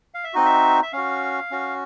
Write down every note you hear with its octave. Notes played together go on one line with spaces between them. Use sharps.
F5
E5
C4 D#4 F#4 D#5
E5
E5
C#4 F#4 F5
C#4 F#4